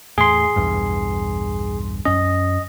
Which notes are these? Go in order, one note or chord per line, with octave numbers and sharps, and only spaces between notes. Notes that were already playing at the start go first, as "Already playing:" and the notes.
E2 A2 G#4 C6
B1 E2 G2
F#2 C#4 D#5